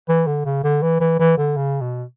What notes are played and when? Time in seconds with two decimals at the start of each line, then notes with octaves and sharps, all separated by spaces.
0.08 E3
0.27 D3
0.45 C#3
0.64 D3
0.82 E3
1.00 E3
1.19 E3
1.37 D3
1.57 C#3
1.81 B2